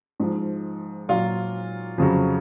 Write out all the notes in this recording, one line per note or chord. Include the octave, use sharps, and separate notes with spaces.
G#2 F3
A#2 F#3 F4
F2 C#3 F#3